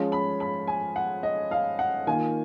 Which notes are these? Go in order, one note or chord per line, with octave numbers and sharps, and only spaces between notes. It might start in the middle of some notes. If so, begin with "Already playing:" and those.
Already playing: F3 G#3 C#4 F4
B5
B5
G#5
F#5
D#5
F5
F#5
D#3 A#3 F4 G#5